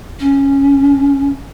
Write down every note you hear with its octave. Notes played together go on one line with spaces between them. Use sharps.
C#4